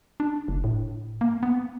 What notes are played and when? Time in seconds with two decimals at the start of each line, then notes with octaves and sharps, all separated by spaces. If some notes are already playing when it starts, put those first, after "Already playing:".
0.20 D4
0.48 F#1
0.64 A2
1.21 A#3
1.43 B3